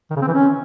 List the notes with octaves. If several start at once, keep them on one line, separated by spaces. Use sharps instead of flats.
D#3
C#3
C4
E3
C#4